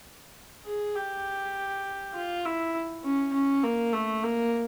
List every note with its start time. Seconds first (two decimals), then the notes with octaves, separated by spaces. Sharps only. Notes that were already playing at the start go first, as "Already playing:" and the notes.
0.66 G#4
0.95 G4
2.14 F4
2.45 E4
3.04 C#4
3.33 C#4
3.63 A#3
3.93 A3
4.23 A#3